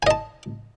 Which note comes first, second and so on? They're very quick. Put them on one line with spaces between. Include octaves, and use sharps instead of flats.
G#5 D#5 A5